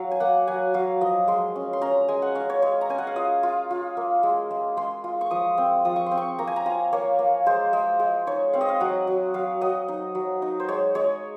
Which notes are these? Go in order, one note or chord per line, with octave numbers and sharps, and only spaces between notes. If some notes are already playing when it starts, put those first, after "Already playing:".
Already playing: F#3 F5
G#5
A#3 F#5
F#3 G#5
F#3 F5
F3 D#5
G#3 C6
C#4
C6
C#4 A#5
G#3 G#5
F#5
C#4 F5
C#5
G#3 C#5
A#5
C#4 G#5
F#5
F5
F4 D#5
F4
F4
A#3
G#3
G#3
G#3 C6
F4
C#6
F3 D#6
C4
F3 D#6
C#6
C6
C4
C#6
A#3 A#5
G#5
A#5
F4 G#5
A#3 C#5
A#3
G#3 C5
G#3
G#3
D#4 C#5
C4 F5
D#5
F5
F#3 F#5
F#3
F#3 F5
F#3 D#5
D#4
F#3
D#4
C5
G#3 C#5
G#3 C#5